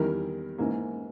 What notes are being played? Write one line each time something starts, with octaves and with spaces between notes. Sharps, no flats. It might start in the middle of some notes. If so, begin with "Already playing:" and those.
Already playing: E2 D#3 G3 A#4
G#2 E3 A#3